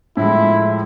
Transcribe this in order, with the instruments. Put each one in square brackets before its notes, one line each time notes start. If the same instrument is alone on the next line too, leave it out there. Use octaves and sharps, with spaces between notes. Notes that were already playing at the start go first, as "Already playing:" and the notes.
[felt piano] A2 F3 G#3 [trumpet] E4